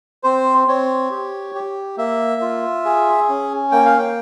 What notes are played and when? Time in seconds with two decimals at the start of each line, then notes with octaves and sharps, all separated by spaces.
0.24 C4 C5
0.68 C4 C#5
1.11 G4
1.55 G4
1.98 A#3 E5
2.42 F4
2.85 G#4
3.29 C#4
3.72 A#3 G5
3.85 F5
3.99 G5